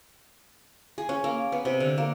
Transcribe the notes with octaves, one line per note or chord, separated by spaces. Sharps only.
G#4
C#4
A#3
B3
C3
D3
A#3